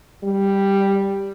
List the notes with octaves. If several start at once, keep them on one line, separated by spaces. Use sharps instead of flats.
G3